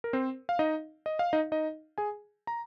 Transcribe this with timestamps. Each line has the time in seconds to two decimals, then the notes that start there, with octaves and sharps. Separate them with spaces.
0.04 A#4
0.13 C4 C5
0.49 F5
0.59 D#4 D#5
1.06 D#5
1.19 F5
1.33 D#4 D#5
1.52 D#4 D#5
1.98 G#4 G#5
2.47 A#5